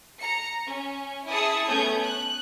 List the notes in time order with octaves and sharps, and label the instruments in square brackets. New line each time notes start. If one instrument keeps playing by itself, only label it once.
[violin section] A#5 C#7
C#4
E4 G#4 A5 D#6 C#7
A3 B3 C#4 D#6 G6 G#6
F#6